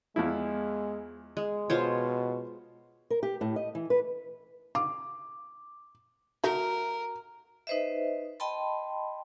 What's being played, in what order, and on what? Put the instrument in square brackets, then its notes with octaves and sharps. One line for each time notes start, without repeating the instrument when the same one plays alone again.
[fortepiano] E2 F3 E4 [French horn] G#3
[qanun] G#3
[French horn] B2 [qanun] F4 C5 C#5
[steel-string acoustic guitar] A#4
G4
A2
D#5
E3
B4
[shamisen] F4 [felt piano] D6
[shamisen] A3 D#4 [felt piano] F#4 [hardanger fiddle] A#4
[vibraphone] D#4 B4 C5 D#5 E5
D#5 G5 A5 B5 C6